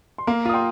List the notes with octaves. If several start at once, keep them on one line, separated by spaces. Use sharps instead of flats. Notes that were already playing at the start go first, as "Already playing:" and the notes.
C6
A#3 F5 A#5
F4 D#6
G5 C6